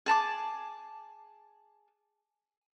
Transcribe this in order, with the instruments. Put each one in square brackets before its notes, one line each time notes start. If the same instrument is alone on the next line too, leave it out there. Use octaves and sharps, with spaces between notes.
[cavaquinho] G#4 A5 B5 D6